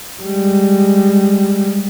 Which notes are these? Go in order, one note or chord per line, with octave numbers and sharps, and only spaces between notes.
G3 G#3